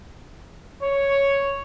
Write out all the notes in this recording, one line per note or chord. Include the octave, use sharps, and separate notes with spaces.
C#5